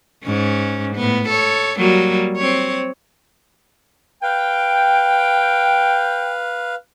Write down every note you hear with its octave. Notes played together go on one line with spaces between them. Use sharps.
G#2 C#4
A2 B3
A4 C#5
F#3 G3 A#3
C4 C#5
B4 F5 G5